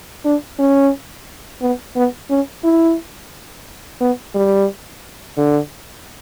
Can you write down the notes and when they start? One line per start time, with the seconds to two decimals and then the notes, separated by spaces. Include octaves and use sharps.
0.25 D4
0.59 C#4
1.62 B3
1.96 B3
2.30 C#4
2.64 E4
4.00 B3
4.35 G3
5.38 D3